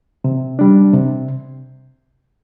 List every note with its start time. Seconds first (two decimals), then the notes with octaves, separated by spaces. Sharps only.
0.24 C3
0.59 G3 D4
0.93 C3